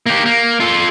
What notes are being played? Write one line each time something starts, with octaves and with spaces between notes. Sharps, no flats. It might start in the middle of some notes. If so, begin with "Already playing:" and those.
A#3 G4
A#3
F4 A4